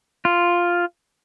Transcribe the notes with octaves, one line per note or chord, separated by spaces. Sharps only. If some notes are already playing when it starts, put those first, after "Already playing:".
F4